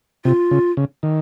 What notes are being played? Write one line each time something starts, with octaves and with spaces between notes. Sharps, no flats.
C3 F4
C#3
C#3
D#3